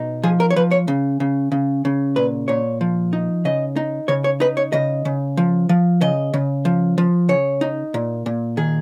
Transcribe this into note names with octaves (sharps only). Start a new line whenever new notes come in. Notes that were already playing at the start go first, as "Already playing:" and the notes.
Already playing: B2 D#4
F3 G#4
A#4
C#5
F3 B4
C#5
C#3
C#3
C#3
C#3
A#2 B4
A#2 C#5
F3
D#4
C#3 D#5
D#4
C#3 C#5
C#5
D#4 B4
C#5
C#3 D#5
C#3
F3
F3
C#3 D#5
C#3
F3
F3
C#3 C#5
D#4
A#2
A#2
D#3 G#4